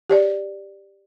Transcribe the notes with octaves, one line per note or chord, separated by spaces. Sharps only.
G4 C#5 D5